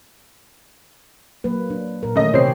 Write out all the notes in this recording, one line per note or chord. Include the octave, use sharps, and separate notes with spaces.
F#3 A#3 B4
D4
A#2 A#4
D#3 E3 A3 C#4 D#5
C3 C4 G4 C#5 C7